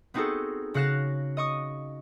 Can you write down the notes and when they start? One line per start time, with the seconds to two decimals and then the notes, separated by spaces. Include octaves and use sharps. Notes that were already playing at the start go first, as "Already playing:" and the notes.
0.14 B3 C4 D#4 F#4 G#4 A4
0.74 C#3 F#4 F5 F#6 A#6 E7
1.37 D#5 C#6 D#6